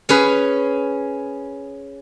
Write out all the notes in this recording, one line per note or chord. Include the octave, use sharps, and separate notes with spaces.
C#4 G#4 B4